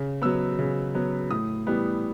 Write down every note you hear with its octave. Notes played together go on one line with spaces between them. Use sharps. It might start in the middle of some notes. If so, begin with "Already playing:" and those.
Already playing: C#3
F#3 B3 E6
C#3
F#3 B3
A2 D#6
E3 G3 B3